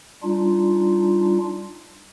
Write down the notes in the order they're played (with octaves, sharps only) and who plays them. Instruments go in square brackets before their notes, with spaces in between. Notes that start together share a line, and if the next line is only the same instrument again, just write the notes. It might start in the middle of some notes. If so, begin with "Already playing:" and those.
[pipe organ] G3 D4 D#4 F4